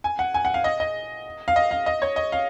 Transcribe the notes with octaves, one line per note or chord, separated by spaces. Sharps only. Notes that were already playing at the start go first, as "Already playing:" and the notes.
G#5
F#5
G#5
F#5
F5
D#5
D#5
F5
D#5
F5
D#5
C#5
D#5
F5